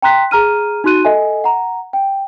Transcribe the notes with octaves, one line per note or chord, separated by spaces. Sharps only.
G5 A#5 C6 F#6 B6
G#4 A#5 F6 D#7
D#4 F#4 C6 F#6 D#7
A4 D#5 E5 G#5
F#5 A#5
G5